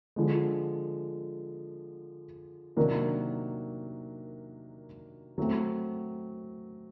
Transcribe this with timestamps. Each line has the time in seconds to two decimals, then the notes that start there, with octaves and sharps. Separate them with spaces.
0.16 D3 F3 G#3
2.77 C3 D#3 F#3 A#3 D4
5.38 F#3 A3 C4